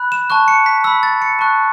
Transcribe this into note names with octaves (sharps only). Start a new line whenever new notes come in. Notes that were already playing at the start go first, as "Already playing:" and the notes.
Already playing: B5 F#6
E7
A5 C#6 F#6
C#7
B6
B5 E6 B6
A6
C#7
A5 C#6 F#6